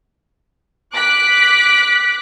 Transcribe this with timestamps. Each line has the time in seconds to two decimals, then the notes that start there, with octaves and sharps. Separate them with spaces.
0.92 D6 F#6 B6